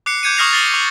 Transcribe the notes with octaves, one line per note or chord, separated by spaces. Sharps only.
D6 F#6 C7 C#7
D6 G6 G#6 C#7 D#7
C#6 D#6 F6 A#6 C7 F7
A6 C7 G7
D6